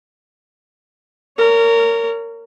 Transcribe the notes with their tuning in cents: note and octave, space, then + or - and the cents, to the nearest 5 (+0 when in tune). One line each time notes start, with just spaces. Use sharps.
A#4 -20 C#5 +20